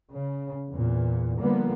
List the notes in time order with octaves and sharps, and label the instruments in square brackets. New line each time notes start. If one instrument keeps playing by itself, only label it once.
[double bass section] C#3
E2 A#2
D3 F3 G3 A#3 B3